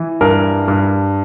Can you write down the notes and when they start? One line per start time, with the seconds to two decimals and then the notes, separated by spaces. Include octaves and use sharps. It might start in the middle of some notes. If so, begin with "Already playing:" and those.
Already playing: E3
0.21 G2 A#4
0.68 G2